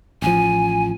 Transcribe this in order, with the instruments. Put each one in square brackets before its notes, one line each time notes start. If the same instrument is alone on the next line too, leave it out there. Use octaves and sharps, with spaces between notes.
[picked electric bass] A1 F3 [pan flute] G#5